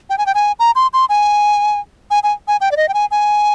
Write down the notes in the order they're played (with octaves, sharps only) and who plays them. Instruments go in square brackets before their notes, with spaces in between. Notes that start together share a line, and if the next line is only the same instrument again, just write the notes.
[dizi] G5
G#5
G5
G#5
A#5
C6
C6
G#5
G#5
G#5
G#5
G5
D5
D#5
G5
G#5
G#5